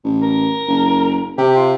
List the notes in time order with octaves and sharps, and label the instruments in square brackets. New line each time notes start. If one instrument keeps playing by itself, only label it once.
[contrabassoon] A1
[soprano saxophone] A#4
[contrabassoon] F#1
[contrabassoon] C3 [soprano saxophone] G4
[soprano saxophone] F4